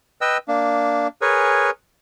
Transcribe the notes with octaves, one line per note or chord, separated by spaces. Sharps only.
B4 D#5 G5 E6
A#3 D4
G#4 A#4 B4 C#5 G#5